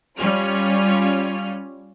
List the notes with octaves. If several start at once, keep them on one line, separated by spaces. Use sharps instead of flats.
G3 C#4 F4 F6